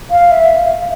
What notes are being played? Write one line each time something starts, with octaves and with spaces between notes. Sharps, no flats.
F5
E5